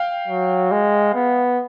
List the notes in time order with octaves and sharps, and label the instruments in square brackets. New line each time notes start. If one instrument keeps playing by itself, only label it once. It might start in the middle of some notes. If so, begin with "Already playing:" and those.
Already playing: [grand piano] F5 G5
[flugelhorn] F#3
G#3
B3